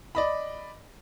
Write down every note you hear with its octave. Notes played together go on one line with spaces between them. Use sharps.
D5 D#5 B5